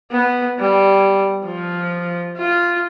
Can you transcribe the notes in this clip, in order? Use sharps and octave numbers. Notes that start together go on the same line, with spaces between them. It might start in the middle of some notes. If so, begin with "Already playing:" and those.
B3
G3
F3
F4